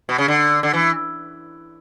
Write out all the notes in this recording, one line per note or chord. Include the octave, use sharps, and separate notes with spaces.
B2
C#3
D3
D3
E3